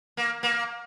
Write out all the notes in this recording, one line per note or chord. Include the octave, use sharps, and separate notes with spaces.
A#3
A#3